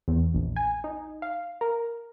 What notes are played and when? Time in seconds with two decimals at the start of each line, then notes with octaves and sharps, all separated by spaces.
0.08 E2
0.34 A#1
0.56 G#5
0.84 D#4
1.22 F5
1.61 A#4